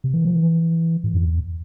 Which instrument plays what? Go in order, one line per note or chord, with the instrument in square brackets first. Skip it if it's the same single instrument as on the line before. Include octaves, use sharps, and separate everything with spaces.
[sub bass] C3
E3
F3
E3
G#2
F2
E2